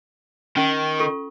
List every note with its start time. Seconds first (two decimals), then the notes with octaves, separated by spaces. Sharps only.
0.57 D#3 C#4
0.99 F4 A4 C#6